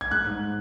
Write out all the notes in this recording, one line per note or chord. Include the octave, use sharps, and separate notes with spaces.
G#6
G#3 F#6
G#2